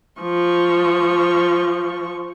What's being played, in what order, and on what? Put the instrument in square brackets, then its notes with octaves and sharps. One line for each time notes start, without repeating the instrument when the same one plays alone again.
[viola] F3 C#6